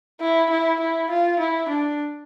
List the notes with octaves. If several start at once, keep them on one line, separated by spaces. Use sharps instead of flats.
E4
E4
E4
F4
E4
D4